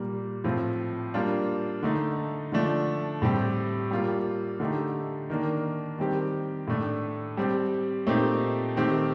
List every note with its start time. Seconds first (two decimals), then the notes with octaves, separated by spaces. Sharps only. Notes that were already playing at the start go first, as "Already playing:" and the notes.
Already playing: A#2 G3 A#3
0.44 A2 F3 C4 F4
1.14 G3 A#3 D4 F4
1.83 D3 A3 D#4
2.52 D3 F3 A3 D4
3.22 A2 G3 C4 G4
3.91 G3 A#3 F4
4.60 D3 A3 D#4 G4
5.30 D#3 A#3 D4
5.98 D#3 G3 C4 G4
6.67 A2 A3 D4
7.37 G3 C4 G4
8.07 A#2 A3 C4 D#4 G4
8.76 D#3 A3 C4 G4